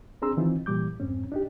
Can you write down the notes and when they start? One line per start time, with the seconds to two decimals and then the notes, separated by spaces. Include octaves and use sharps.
0.22 C4 D4 G#4 A#5 C6 E6
0.37 D#3 E3 C4 D#4 F4
0.66 A#2 E3 G3 D6 G6
1.00 F2 G#2 C4 C#4
1.32 D4 D#4 G4